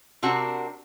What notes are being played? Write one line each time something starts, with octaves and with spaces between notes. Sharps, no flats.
C3 C4 D4 F#4 A#4